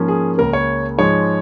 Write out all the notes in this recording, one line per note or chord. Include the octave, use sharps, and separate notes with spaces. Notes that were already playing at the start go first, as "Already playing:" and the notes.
Already playing: G#2 F3 A#3 C#4
G#4
C#2 C#3 A#3 A#4
C#5
G#2 F3 G#3 C#5